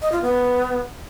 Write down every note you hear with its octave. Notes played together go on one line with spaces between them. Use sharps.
D#5
F4
B3